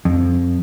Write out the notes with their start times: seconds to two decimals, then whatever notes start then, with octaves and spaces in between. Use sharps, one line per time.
0.05 F2